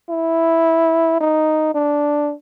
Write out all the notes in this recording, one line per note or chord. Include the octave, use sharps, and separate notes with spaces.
E4
D#4
D4